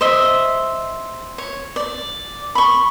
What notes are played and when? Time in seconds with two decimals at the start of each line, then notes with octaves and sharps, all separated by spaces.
0.01 C5 D#5 E5
1.38 C#5
1.76 D5
2.55 B5 C#6